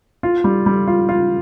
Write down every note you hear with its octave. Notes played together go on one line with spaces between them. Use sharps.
F4
G3
G3
F4
F4